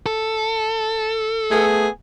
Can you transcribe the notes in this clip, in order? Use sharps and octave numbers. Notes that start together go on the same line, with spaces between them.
A4
A3 B3 G#4